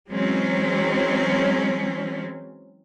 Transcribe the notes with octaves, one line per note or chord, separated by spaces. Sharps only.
E3 F#3 G#3 C4 C#4